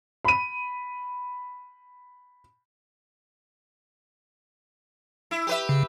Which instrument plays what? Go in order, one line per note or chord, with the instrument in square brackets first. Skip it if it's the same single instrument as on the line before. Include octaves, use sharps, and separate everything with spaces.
[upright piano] B5 D#7
[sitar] E4
G4 B4 E5
[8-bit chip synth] C#3